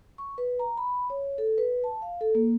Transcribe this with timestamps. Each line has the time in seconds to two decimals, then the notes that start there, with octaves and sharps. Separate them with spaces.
0.18 C#6
0.38 B4
0.59 A#5
0.77 B5
1.10 C#5
1.38 A4
1.58 B4
1.84 A5
2.02 F5
2.21 A4
2.35 A#3